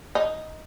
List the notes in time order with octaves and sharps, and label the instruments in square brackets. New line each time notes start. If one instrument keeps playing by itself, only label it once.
[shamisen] D#4